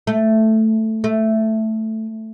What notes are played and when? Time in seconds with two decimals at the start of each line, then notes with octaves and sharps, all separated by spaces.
0.07 A3
1.04 A3